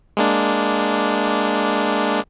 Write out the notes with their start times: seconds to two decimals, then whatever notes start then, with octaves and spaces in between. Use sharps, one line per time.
0.17 G#3 A#3 D4